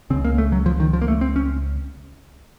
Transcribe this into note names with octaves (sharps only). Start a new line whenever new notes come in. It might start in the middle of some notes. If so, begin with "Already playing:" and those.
C#2 C#3 C4
A#3
A3
F#3
F3
D#3
F3
A#3
A3
C4
C#4